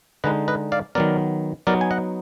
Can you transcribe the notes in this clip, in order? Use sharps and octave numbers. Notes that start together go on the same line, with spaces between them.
D3 G#3 D#4 B4 D#5
B4 D#5
D5 F5
D#3 F#3 B3 A#4 D5
F#3 B3 D#4 A#4 D5
G#5
D#5 F#5